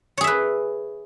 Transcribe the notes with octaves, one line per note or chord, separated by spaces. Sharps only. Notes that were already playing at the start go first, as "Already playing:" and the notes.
G#4 B4 C#5 E5